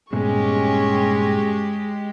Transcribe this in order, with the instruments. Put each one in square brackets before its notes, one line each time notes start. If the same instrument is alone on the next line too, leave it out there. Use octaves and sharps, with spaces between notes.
[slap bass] G2 A#2 B3 [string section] G#3 G4 [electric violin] C#4 C#6